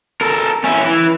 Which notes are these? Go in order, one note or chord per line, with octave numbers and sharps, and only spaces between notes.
A4 A#4
C#4 E4
E3